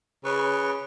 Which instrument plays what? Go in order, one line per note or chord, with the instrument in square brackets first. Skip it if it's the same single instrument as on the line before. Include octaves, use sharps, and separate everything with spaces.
[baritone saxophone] C#3 [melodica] B4 C#6